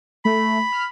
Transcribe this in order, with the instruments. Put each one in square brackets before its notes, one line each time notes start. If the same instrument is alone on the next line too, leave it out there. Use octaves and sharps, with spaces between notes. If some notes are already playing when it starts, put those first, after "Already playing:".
[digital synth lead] A3 [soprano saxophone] B5
[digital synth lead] F6